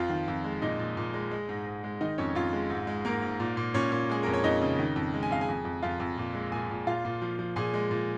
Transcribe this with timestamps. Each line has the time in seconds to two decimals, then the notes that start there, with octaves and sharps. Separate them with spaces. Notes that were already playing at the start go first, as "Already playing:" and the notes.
Already playing: F2 F3 F4 F5
0.10 D#3
0.28 F2
0.44 G#3
0.62 A#2 D#4 D#5
0.79 A#2
0.97 A#2
1.14 G#3
1.31 G#3
1.49 G#2
1.66 G#2
1.84 G#3
2.01 D#3 D#4 D#5
2.18 F2 C#4 C#5
2.35 F2 F4
2.53 G#3
2.70 G#2
2.87 G#3
3.05 G#2 A#3 A#4
3.22 G#2
3.40 A#2
3.57 A#2
3.74 A#2 C#4 C#5
3.92 A#2
4.10 G#3 G#4
4.23 F2 A#4
4.34 C#5
4.44 F2 D#4 D#5
4.61 C#3
4.79 D#3
4.96 F2
5.14 G#3
5.23 G#5
5.31 F2 F5
5.40 G#4 G#5
5.48 F2
5.65 F2
5.82 F2 F4 F5
6.00 F2
6.18 A#2
6.34 G#3
6.52 A#2 G#4 G#5
6.70 A#2
6.87 A#2 F4 F5
7.05 A#2
7.22 F3
7.39 F3
7.56 A#2 G#4 G#5
7.74 G#3
7.91 A#2